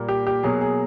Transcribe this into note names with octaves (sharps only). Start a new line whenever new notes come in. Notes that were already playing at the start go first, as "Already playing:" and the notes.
Already playing: A#2 G3 A#3
G4
G4
B2 F#3 A#3 G#4
G#4